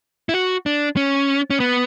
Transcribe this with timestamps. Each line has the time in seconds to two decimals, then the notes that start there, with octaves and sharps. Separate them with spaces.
0.29 E4
0.34 F#4
0.66 D4
0.97 C#4
1.50 C#4
1.60 B3